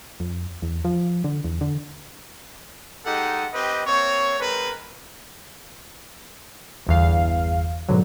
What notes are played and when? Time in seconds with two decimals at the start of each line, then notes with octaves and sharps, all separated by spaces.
0.20 F2
0.62 E2
0.85 F3
1.24 D3
1.44 E2
1.61 D3
3.06 G#3 D#4 G4 A4 F#5
3.53 C4 G4 B4 D#5
3.85 A#3 C4 C#5
4.40 G#3 C4 A#4 B4
6.86 G1 E2 F5
7.88 G#2 B2 D3 F#3